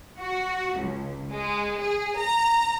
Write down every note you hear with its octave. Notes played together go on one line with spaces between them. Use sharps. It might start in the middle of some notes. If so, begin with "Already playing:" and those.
F#4
C#2
G#3
G#4
A#5